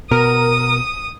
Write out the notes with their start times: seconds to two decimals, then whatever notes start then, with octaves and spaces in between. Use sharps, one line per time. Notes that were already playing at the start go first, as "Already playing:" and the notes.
0.11 B2 B3 A#4 D#6